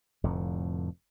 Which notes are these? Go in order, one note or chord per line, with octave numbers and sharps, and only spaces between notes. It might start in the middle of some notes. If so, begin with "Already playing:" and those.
F1 F2 A2 D3